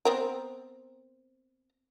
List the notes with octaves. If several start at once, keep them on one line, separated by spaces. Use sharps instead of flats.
B3 C4 A#4